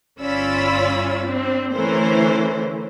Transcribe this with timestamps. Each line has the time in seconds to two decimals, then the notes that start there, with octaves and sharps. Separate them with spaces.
0.19 G1 C#4 F4 D5 B5 E6
1.26 C4 D4
1.73 D3 E3 A3 C#4 A#4 C5